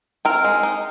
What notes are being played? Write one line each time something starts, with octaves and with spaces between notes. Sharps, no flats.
C4 A#4
G#3
D#4